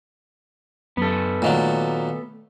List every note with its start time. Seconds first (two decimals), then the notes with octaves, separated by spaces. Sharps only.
0.97 F#2 B3 A4
1.42 A#2 D#3 F#3 A3